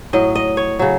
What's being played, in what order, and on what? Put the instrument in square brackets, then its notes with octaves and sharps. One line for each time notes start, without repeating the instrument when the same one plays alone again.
[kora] A2 F#3 D#5
D#5
C#5
C#3 F#3